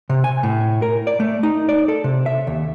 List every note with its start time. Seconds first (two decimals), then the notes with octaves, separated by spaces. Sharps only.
0.09 C3
0.24 G#5
0.43 A2
0.82 A#4
1.07 D5
1.20 A3
1.43 D#4
1.69 D5
1.88 A4
2.04 C3
2.26 E5
2.47 D#2